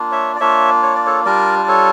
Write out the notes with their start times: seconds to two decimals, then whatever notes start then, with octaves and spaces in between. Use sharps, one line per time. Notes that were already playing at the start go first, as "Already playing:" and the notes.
Already playing: A#3 D4 F4
0.11 C#5 E5
0.36 D5
0.40 A#3 D4 F4 C#5 E5
0.83 C#5
0.95 D5
1.06 A4 C#5
1.25 G3 D4 F4 A#4 D5
1.63 D5
1.68 A4 C#5